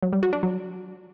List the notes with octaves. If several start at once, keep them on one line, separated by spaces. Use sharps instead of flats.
F#3
G3
F#4
D4
F#3